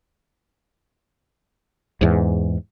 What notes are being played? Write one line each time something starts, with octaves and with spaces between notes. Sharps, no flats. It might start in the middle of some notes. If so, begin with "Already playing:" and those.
E2 G#2